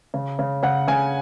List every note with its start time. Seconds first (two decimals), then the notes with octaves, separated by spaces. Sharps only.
0.14 C#3
0.39 C#3
0.63 C#3 F#5
0.88 C#3 G#5